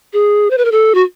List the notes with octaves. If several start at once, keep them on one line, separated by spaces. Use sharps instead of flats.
G#4
C5
B4
A#4
A4
F#4